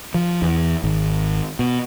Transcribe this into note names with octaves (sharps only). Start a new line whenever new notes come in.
F3
E2
G#1
B2